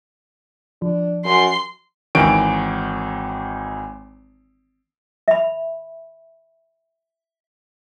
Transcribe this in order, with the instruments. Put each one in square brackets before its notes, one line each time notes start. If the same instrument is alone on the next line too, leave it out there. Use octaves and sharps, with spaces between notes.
[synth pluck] F3 [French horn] D4
[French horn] F#2 [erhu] C6
[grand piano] G#1 D#3 E3 C#5 D7
[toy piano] E5 B5